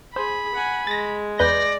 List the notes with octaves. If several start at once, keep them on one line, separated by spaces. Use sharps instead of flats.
G#4 C5 B5
F#5 G#5
G#3 A6 A#6
E2 B4 D5 G6 A#6